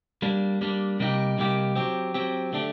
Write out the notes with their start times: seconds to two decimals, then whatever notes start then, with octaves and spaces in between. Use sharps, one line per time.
0.22 G3 A#3 D4
0.61 G3 A#3 D4
1.00 C3 G3 A#3 D#4 G4
1.38 C3 G3 A#3 D#4 G4
1.76 F#3 C4 G4
2.14 F#3 C4 G4
2.53 D3 A3 D4 G4